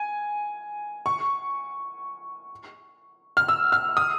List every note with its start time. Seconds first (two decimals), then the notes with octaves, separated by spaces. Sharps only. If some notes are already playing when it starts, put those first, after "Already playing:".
Already playing: G#5
1.06 C#6
3.37 F6
3.49 E6
3.72 F6
3.97 D#6